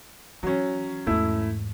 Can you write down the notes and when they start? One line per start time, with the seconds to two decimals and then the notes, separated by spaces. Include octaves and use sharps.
0.43 E3 F#3 C#4
1.07 E2 G#2 A3 E4